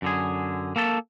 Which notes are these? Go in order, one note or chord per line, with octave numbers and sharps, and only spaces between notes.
F#2 D3 G#4
A#3 A4 A5